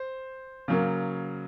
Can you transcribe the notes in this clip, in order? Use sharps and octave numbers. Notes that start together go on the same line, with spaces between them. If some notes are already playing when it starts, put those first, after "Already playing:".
Already playing: C5
C#3 F#3 A#3